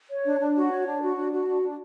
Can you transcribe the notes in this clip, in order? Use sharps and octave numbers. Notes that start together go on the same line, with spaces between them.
C#5
D4
D4
F#4
C#5
D4
F#4
D4
F#4
D4
D4